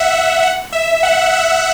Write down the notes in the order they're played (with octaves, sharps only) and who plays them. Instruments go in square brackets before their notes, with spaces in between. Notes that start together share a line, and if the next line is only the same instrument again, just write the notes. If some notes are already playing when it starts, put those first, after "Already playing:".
Already playing: [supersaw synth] E5 F#5
F#5
E5
F#5
E5